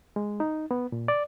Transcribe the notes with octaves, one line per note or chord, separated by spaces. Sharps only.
G#3
D#4
B3
A#2
D5